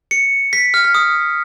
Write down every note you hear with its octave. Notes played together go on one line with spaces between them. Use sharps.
C#7
B6
F6
F6
D#6